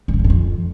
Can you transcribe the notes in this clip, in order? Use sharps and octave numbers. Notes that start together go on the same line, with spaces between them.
G2
B2
G2
G#2
F2